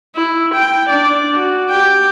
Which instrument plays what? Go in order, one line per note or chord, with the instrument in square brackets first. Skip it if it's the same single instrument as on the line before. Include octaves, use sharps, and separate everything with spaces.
[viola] E4
G5
D4 D5
F#4
G4 G5